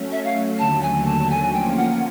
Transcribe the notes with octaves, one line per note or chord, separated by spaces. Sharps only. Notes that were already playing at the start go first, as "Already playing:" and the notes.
Already playing: F#3 A3 C#4
E5
F5
D#2 D3 F#3 A3 A5
G#5
A5
G#5
F3 A#3 C#4 F4 G5
F#5